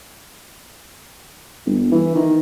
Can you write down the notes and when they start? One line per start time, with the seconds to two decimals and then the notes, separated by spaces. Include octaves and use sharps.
1.66 G1
1.92 E3
2.15 D#3